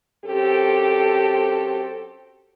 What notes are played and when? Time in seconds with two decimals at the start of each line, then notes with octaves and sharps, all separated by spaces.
0.25 F#2 C4 G4 A4